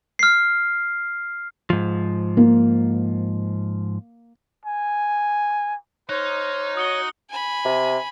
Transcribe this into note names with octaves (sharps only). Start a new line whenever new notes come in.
F6 C7
G#2 F3
A#3
G#5
D#4 C5 C#5 F6 F#6
F#4 D#6 C#7 G7
G#5 B5
C3